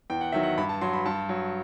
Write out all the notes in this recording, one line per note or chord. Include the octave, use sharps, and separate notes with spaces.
E2 G5
F#5
D#3 F#3 E5
F#5
G2 B5
A5
F#3 C6
B5
G2 A5
F#3